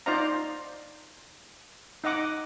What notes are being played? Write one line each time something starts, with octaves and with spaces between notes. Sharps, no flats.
D#4 F4 C5 D5 F5 A#5
D#4 D#5 F#5 D6